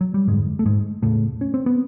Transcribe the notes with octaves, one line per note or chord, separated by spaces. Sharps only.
F#3
G3
F2 G#2 D3 G#3
A3
G#2 G#3
E2 A2 C#3 A3
C#4
C4
B3